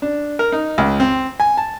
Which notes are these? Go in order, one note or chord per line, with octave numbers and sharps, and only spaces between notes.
D4
A#4
D#4
C#2
C4
G#5
A5